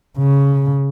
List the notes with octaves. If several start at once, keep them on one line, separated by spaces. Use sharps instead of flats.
C#3